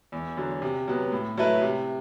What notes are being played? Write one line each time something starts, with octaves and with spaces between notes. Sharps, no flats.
E2
D3 F#3
C3
F#3 B3
A2
F#3 A3 E4 B4
C3